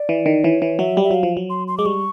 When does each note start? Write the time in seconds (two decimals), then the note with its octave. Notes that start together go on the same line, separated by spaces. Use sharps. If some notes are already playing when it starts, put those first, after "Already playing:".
Already playing: D5
0.09 E3
0.26 D#3
0.44 E3 C#5
0.62 E3
0.79 F#3 E5
0.97 G3
1.04 E5
1.11 F#3 F5
1.23 F3
1.37 F#3
1.50 C6
1.68 C6
1.78 G#3 D6
1.86 G3 C#6